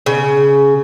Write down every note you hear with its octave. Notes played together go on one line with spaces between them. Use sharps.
C#3